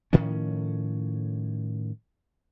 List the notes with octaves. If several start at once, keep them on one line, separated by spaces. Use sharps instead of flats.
A2 D#3 F3 C#4